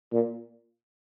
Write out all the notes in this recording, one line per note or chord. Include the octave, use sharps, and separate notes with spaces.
A#2